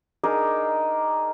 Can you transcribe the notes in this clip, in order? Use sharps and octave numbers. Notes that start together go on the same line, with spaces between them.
D4 D#4 G#4 A#4